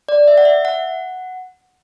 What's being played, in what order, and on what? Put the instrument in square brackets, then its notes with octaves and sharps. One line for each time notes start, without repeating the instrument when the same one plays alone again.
[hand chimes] D5
E5
F#5
E5
F#5